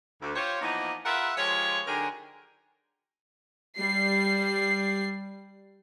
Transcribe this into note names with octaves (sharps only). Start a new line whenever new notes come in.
D2
F4 G4 C5 C#5
E3 F3 A#3 B3 D#4
F4 G#4 A#4 B4 E5 F#5
F3 G#3 F4 G4 C#5
D3 F#3 D#4 G4 G#4 A#4
G3 C7